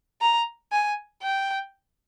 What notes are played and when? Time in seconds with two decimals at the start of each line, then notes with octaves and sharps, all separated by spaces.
0.21 A#5
0.72 G#5
1.23 G5